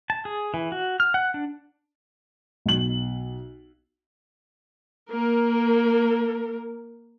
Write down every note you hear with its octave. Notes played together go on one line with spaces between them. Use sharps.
A5
G#4
E3
F#4
F6
F#5
D4
B1 F#7
A#3 A#4